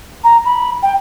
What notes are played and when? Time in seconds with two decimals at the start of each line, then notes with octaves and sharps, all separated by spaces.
0.24 A#5
0.45 B5
0.82 G5